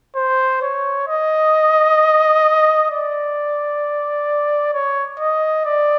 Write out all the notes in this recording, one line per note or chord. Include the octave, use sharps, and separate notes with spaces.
C5
C#5
D#5
D5
C#5
D#5
D5